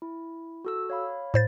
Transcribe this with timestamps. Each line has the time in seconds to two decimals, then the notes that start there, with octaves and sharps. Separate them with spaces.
0.02 E4
0.65 F#4 A4 E6
0.90 C#5 F5 B5
1.34 A2 C5 A6